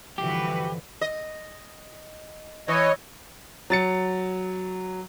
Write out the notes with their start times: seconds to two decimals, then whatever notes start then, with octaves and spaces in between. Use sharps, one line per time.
0.18 G2 D3 E3 F3 F#4 G4 B4
1.01 D#5
2.68 E3 C#5 D#5
3.70 F#3 A6 C#7